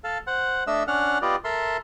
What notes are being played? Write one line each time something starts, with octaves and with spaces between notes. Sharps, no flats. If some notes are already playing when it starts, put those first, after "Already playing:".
A4 F5
C5 F#5
A3 D4 D#5 E5 E6
C#4 D4 F#5 F6
B3 F4 G4 D5 D#5
A4 A#4 E5 C6